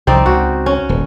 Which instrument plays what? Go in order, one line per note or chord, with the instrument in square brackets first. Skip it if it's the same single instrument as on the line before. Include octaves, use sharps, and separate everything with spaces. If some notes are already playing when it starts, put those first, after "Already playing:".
[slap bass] C2 F3 [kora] C4 D#4 D5
[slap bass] C#2 [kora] F#4
[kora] C#4
[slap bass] D#1